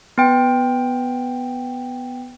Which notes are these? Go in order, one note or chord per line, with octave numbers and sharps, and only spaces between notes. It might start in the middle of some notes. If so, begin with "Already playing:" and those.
B3 G5